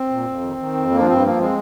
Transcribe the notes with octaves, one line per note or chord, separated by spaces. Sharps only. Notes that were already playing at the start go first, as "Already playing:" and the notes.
Already playing: C4
A#2
F2
D#3
D#3
F2
F3 A#3
D4
G2 C4
F3 A#3
G#3 C4